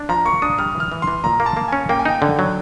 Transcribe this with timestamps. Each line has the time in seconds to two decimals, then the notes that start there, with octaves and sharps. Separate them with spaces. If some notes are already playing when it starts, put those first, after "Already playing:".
Already playing: D4
0.09 F3 A#5
0.25 A#3 C#6
0.42 D4 D#6
0.58 G3 F6
0.75 E3
0.80 F6
0.92 E3
1.02 C6
1.07 E3
1.24 A#2 A#5
1.40 A#3
1.46 A5
1.57 A#3
1.68 C#4 G#5
1.89 A#3 G5
1.99 G#5
2.05 D#4 G5
2.22 D3
2.39 F#3